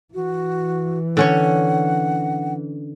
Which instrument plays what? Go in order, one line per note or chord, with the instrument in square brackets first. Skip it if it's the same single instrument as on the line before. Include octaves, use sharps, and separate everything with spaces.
[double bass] E3 [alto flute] F#4
[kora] D3 C#4 C#5 [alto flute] F#5